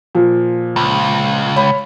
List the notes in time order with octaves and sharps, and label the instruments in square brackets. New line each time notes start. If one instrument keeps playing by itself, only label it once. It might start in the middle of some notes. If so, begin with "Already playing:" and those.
[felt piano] A#2 F3
[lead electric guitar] C#2
[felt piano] C#5 B5